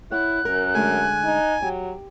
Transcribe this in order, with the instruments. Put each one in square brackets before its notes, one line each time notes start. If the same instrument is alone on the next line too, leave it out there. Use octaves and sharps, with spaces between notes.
[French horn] E4 [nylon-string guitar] C#5 F#5 [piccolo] F#6
[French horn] F#2 [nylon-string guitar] A#4
[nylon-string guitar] D3 G#3 A3 [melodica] G#5
[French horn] D#4
[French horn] F#3 [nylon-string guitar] G4